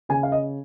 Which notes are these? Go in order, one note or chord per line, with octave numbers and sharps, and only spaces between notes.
C#3 G#5
F5
D#5